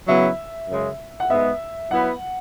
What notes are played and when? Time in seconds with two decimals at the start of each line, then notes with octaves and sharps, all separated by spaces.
0.08 C#3 F#3 B3 E4 E5
0.68 F#2 C#3 G#3
1.20 F#5
1.30 G#2 G#3 B3 E5
1.91 F#3 B3 E4 B4 F#5